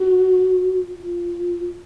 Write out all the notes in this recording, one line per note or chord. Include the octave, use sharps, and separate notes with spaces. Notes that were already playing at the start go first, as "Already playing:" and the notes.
Already playing: F#4
F4